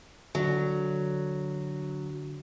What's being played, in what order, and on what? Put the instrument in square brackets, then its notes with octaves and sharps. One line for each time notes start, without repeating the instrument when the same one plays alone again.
[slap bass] D3 [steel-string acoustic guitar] F#3